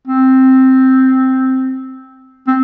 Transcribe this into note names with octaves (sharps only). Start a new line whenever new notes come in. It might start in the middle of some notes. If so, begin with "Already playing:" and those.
C4
C4